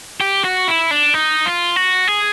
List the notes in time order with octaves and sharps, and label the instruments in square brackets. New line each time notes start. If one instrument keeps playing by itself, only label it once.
[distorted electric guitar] G4
F#4
E4
D4
D#4
F4
F#4
G#4